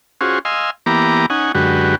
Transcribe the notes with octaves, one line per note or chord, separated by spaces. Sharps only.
C#4 F4 F#4 G#4 C5
D#5 F5 G#5 C6 E6
E3 A#3 B3 G4 A#5 D6
C#4 D#4 F#5 G#5
F#2 D3 G#3 F#4 G4 B4